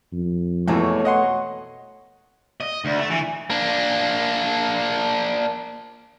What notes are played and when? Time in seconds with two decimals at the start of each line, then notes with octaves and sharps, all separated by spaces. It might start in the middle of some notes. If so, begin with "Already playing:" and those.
0.13 F2
0.68 E2 B2 E3 A3 A4 C#5
1.05 D#5 F#5 C6
2.61 D#5
2.85 D2
2.99 A3
3.10 E3
3.50 A#3 D4